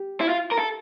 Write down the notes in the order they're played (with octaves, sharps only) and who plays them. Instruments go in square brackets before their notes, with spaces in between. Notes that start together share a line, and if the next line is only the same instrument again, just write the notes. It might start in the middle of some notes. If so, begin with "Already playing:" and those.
Already playing: [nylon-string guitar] G4
[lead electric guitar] E4
F4
A#4
A4